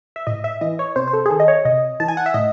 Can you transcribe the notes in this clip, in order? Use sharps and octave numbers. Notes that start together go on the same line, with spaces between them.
E5
A2 D#5
E5
E3 D#5
C#5
C3 C5
C5
A4
G#4
D#3 A4
D#5
C#5
C3 D#5
E3 A5
G#5
F#5
E5
A2 D#5